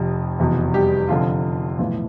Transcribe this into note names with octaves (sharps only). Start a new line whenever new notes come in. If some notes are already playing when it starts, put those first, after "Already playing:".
Already playing: F1 F2 C3
F1 E2 B2
G3 G4
F1 F2 D3 F3 F4
B1 A2 E3 F3 F4